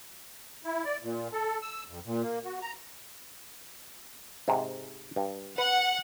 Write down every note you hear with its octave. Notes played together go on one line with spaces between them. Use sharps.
E4
D5
A#2
A4
E6
F2
A#2
A#3
F#4
A#5
G#2 C3
G2
B4 F#5